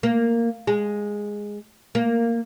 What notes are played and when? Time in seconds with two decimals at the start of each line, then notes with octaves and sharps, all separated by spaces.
0.03 A#3
0.67 G#3
1.95 A#3